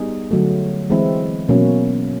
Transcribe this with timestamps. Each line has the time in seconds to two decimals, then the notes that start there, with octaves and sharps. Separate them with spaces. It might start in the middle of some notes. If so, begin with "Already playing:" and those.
Already playing: G3 B3 D#4 G#4
0.31 D3 F#3 A3
0.90 E3 G#3 C4 E4
1.49 B2 F#3 A#3 C#4